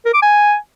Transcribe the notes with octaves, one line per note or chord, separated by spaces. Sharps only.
A#4
D6
G#5